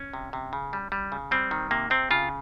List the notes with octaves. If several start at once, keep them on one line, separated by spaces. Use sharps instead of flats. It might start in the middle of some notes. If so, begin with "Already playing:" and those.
Already playing: C#4
C3
C3
C#3
G3
G3
C#3
G3 C4
D#3
C3 A#3
C3 C4
C#3 F4